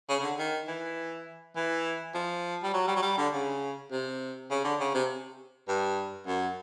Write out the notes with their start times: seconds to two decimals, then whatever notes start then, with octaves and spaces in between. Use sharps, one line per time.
0.09 C#3
0.19 C#3
0.23 D3
0.39 D#3
0.68 E3
1.56 E3
2.15 F3
2.63 G3
2.74 F#3
2.87 G3
2.96 F#3
3.02 G3
3.18 D3
3.33 C#3
3.91 C3
4.51 C#3
4.64 D3
4.80 C#3
4.94 C3
5.68 G2
6.27 F#2